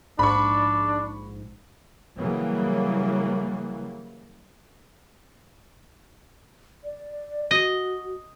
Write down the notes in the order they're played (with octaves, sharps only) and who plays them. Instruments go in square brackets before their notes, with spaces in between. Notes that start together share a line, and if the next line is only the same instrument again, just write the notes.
[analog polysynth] A#1 G#2 [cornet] D4 [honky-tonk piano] B5 C#6
[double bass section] C#3 E3 F#3 G3 A#3
[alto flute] D5
[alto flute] F#4 [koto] D#5